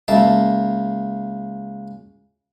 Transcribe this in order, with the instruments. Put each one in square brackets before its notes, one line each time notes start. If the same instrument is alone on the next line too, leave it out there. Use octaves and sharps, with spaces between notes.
[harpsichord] C#2 A#3 E5 A5